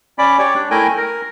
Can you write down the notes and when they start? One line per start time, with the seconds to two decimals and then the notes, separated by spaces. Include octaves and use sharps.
0.18 C#4 D5 B5
0.39 G4 C#5 D5
0.55 D4
0.71 A3 E4 A#4 G5 G#5
0.97 A#4